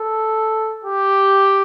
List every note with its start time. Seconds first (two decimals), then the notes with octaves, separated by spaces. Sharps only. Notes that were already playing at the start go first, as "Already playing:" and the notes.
Already playing: A4
0.85 G4